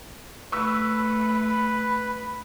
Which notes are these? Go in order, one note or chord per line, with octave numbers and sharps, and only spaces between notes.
A3 B4 B5 C#6 E6